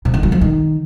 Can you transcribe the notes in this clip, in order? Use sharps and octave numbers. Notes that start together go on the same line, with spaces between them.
C3
D#3
F#3
F3
D#3